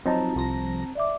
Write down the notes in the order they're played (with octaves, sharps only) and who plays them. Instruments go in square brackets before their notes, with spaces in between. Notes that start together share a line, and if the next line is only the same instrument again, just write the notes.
[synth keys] F3 F#3 D#4 [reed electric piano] C4 A5 A#5
[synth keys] C2 F3 A#6
[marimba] D5 E5 D6